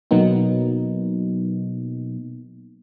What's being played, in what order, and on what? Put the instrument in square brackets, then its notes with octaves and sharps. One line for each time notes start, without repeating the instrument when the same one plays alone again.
[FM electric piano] B2 F#3 A#3 B3 D#4